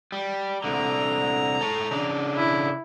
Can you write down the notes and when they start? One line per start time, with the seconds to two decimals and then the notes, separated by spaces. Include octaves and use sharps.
0.12 G3
0.64 C2 D3 A#5
1.61 A4 C#5
1.91 C#3 D4
2.35 E4